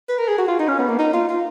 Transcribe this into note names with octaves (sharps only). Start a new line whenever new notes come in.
B4
A#4
G#4
F#4
F4
D#4
C#4
B3
A#3
D#4
F4
F4